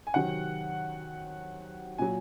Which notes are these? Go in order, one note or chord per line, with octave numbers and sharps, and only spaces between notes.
G#5
C3 D#3 F#3 F#5
A#2 F#3 G#5